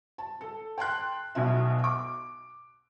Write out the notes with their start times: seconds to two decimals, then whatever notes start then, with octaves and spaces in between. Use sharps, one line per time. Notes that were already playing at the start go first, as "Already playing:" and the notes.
0.18 A5
0.41 A4
0.78 G5 A5 C6 F#6
1.35 B1 B2 E5
1.84 D6